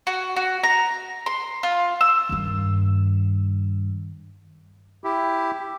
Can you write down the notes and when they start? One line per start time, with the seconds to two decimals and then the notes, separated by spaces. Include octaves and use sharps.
0.07 F#4
0.36 F#4
0.63 A#5
1.26 C6
1.63 F4
2.01 E6
2.29 G2 D#3
5.04 E4 G4